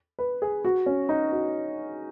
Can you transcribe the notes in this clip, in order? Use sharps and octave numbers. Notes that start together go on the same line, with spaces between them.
B4
G#4
F#4
C#4
D#4
F#4